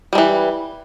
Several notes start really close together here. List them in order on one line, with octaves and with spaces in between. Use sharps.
G3 G#3 E3